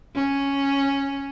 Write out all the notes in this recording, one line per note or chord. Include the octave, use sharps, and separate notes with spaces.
C#4